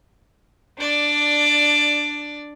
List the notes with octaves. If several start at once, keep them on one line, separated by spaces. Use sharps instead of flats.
D4 D5